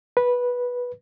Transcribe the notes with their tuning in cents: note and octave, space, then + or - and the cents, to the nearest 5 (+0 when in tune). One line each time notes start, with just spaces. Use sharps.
B4 -10